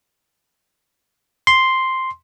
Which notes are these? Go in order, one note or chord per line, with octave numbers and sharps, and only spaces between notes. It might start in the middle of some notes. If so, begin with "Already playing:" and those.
C6